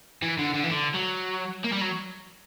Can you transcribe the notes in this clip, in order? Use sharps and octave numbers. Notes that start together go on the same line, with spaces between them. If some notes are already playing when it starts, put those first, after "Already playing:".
E3
D3
D3
E3
D3
F#3
A#3
G3
F#3